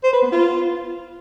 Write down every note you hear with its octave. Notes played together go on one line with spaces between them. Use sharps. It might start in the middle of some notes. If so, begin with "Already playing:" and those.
C5
B4
B3
F4